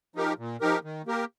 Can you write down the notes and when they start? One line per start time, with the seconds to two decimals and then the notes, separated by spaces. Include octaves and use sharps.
0.15 F3 D#4 G4 A#4
0.38 A#2
0.61 F3 D#4 G4 A#4
0.84 D#3
1.06 A#3 G4 A#4